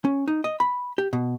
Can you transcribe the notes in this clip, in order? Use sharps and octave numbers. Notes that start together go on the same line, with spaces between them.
C#4
D#4
D#5
B5
G4
B2